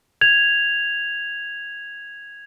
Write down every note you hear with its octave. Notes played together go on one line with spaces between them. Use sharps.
G#6 F7